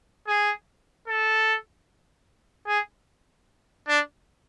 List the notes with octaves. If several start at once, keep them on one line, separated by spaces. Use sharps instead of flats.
G#4
A4
G#4
D4